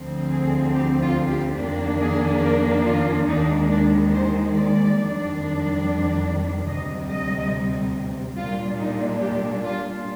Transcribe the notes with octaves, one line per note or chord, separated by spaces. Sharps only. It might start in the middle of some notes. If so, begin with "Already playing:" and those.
Already playing: D2 D3 F3 C4
G#4
G4
F4
G4
F2 D#3 A#3 D4
G#4
A#4
F4
D#2 D#3 G#3 D4 D#4
D4
C5
D5
F2 D#3 G3 D4
D2 C3 G3 D#5
D#5
A#2 G3 D4 F4
D#4
G4
F4